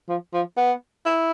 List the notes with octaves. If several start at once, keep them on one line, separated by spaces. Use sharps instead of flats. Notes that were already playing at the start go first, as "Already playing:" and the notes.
F3
F3
B3
E4